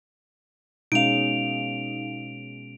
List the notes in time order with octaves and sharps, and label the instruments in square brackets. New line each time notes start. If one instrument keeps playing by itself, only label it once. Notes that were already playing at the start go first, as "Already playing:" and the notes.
[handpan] B2 G#3 C#4 [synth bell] D#4 F5 [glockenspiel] D7 F7